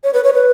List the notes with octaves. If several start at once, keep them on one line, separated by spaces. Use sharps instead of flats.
C#5
B4
C#5
B4